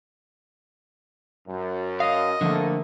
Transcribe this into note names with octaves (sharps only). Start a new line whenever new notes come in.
F#2
D#5 F5
D3 F3 A3 A#3